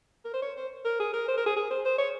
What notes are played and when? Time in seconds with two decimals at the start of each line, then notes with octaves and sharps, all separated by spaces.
0.25 A#4
0.34 C5
0.42 C#5
0.57 C5
0.85 A#4
0.99 G#4
1.13 A#4
1.28 C5
1.37 A#4
1.46 G#4
1.57 G#4
1.71 C5
1.85 C5
1.98 C#5